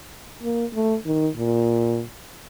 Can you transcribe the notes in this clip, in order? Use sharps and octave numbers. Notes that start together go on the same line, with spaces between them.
A#3
A3
D#3
A#2